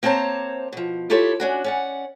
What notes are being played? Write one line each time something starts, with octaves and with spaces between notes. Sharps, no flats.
A#3 C4 C5 C#5 A5 A#5
B2 F3
E4 F4 G4 A4 C#5
C#4 D4 F#4
C#4 D5 F#5